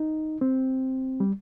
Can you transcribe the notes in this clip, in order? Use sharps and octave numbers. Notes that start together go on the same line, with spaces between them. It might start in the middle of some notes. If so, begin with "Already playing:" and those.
Already playing: D#4
C4
G3